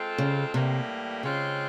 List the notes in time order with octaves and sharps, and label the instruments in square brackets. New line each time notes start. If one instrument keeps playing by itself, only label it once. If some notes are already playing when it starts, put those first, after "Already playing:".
Already playing: [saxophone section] G#3 C4 F4 A4
[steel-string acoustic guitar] C#3
[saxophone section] A2 E3 G3 A#3 [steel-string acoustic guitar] C3
[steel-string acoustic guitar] C#3 [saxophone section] G#3 C4 F4 G#4 C#5